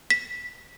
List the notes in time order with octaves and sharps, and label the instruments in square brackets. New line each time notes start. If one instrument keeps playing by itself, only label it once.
[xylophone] B6